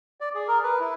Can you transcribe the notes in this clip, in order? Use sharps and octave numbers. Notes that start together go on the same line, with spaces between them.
D5
G#4
A#4
B4
E4